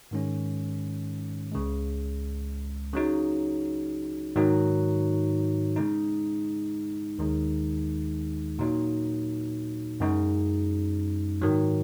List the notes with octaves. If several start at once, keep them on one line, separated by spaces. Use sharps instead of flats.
G#2 D#3 G#3 C#4
C#2 C#3 G#3
C#3 F#3 D#4
G#2 D#3 F#3 D#4
C#3 G#3 D#4
D#2 D#3 G#3 D#4
A#2 F#3 D#4
F#2 C#3 G#3 D#4
G#2 D#3 F#3